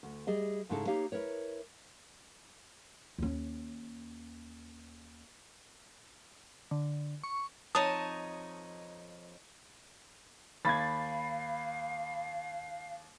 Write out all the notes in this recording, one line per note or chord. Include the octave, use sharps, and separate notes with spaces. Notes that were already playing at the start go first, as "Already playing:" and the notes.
D2
G3 G#4 D#5 E5
G#2 C#3 G#3 D#4 E4 A4
A#3 D#4 G4 C#5 F5
E4 A#4 B4 C#5
D#2 C#4
D3
C#6
F2 D#4 C#5 D#5 A5 D#6
D#2 F5 B5 G#6 A6